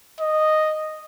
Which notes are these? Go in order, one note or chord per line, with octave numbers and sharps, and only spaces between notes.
D#5